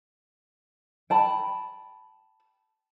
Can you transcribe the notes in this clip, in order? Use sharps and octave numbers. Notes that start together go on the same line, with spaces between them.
G5 A5 B5